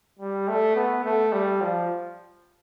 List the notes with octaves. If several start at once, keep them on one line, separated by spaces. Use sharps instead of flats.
G3
A3
B3
A3
G3
F3